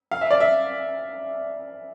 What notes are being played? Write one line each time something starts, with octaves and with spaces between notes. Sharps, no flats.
F5
E5
D5
E5